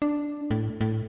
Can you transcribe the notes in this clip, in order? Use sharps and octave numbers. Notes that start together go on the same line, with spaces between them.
D4
A2
A2